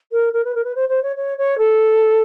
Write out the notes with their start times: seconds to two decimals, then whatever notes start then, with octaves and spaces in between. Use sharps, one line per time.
0.12 A#4
0.33 A#4
0.44 B4
0.55 A#4
0.64 B4
0.75 C5
0.89 C5
1.03 C#5
1.16 C#5
1.38 C#5
1.58 A4